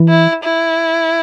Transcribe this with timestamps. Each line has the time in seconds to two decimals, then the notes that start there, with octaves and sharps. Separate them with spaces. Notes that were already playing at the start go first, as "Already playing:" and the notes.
Already playing: E3
0.08 E4
0.44 E4